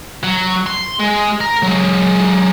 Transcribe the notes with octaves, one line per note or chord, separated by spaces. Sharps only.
F#3
C6
G#3
A#4
F#3 G#3